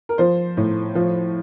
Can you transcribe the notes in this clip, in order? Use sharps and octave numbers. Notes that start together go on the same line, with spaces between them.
A#4
F3 C5
A2
F3